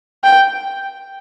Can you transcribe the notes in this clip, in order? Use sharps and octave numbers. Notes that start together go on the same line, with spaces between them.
G5